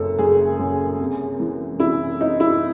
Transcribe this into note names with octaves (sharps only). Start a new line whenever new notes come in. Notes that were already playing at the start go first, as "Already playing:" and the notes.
Already playing: F#1 F#2 A4
F#1 G#4
F#2
C3
E3
C3 E4
C4 D#4
E4